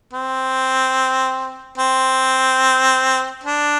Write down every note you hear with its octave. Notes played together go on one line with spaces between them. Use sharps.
C4
C4
D4